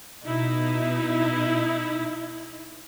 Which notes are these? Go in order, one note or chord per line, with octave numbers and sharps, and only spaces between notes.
B2 D#4 E4